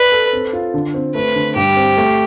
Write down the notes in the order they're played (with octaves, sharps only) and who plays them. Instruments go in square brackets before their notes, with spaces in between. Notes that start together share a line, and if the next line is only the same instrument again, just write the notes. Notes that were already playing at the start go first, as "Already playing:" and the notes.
Already playing: [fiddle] B4 [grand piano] D5
[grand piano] A4
C4
F4
D3
C4
[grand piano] A3 [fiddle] B4
[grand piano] D3
[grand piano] G2 [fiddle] G4
[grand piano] C4
A3